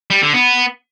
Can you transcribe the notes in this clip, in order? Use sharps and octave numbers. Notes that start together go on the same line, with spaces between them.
G3
D3
B3